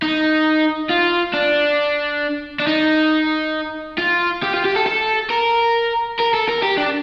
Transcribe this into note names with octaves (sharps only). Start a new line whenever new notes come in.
D#4
F4
D4
D4
D#4
F4
G4
F4
G4
A4
A4
A#4
A#4
A4
A#4
G4
D4